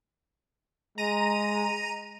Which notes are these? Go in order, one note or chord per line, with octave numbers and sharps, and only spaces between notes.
G#3 A#5 D#7